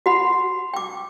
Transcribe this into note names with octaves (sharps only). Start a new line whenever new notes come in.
F#4 F#5 B5
G5 D6